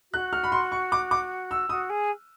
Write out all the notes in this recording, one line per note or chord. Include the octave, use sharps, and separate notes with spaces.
F#4 F#6
F6
B5
C6
C#6
D6
D6
E6
F#4 D#6
G#4